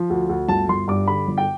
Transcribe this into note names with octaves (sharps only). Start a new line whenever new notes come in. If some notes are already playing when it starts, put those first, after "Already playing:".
Already playing: F3
D2
D2
G1 A5
G1 C6
G2 D6
D3 B5
G1
G5